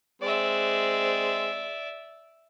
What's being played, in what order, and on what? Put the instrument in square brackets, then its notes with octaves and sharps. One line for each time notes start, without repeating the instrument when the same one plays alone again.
[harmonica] G#3 C4 [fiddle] D5 E5